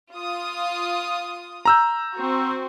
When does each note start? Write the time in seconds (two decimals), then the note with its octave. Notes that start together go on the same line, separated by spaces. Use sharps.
0.13 F4 D#6
1.65 A#5 E6 G6
2.14 C4 F#4